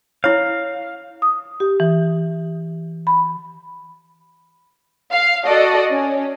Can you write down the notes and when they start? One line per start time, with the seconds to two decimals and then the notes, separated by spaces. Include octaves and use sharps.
0.24 E4 C#5 F5
1.22 D#6
1.60 G4
1.80 E3
3.07 B5
5.13 F5
5.46 F#4 A4 D5 D#5
5.90 C#4